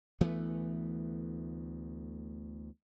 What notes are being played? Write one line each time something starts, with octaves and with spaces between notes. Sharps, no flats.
D2 E3 A3 B3